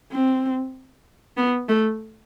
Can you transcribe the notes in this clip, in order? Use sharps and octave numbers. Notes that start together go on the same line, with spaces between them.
C4
B3
A3